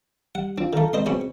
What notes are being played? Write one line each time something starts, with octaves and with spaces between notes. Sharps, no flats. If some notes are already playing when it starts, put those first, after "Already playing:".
G3 F#5
C4 D4 F4
D#3 A3 A4 F5 A#5
G#3 C4 B4 C5 D#5 C6
B2 C4 C#4 G#4 B4 G#5